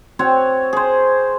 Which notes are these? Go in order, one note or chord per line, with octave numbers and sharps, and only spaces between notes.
C4 F#4 C#5
G#4 C5